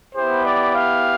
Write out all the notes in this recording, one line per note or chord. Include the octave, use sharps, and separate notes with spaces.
B3 E4 G4 C5
D5
F5